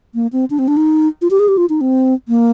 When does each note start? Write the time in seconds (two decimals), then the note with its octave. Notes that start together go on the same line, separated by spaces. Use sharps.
0.15 A#3
0.33 C4
0.50 D4
0.59 C4
0.68 D4
0.77 D#4
1.22 F4
1.31 G4
1.39 G#4
1.48 G4
1.57 F4
1.69 D#4
1.81 C4
2.28 A#3